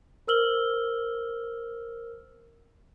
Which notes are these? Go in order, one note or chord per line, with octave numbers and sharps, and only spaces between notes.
A#4 C5 E6 F6 F#7 G7